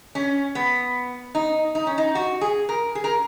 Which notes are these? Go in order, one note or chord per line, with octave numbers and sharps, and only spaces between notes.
C#4
B3
D#4
D#4
C#4
D#4
F#4
G#4
A#4
G#4
A#4